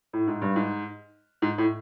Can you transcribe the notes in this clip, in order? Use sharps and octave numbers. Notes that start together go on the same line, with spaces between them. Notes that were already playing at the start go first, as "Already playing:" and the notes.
A2
G#2
G2
G#2
G#2
A2